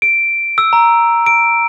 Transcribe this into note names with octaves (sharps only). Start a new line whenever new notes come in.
D7
E6
A#5
D7